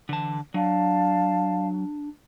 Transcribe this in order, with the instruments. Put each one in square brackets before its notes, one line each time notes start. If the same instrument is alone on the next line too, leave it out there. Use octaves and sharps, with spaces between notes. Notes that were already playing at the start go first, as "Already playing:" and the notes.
[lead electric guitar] D3 A5 [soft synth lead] E3
[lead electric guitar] F#3 [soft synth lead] D4 [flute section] D5 F5 A5